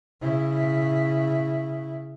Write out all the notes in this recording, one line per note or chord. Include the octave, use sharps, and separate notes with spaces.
C#3 E4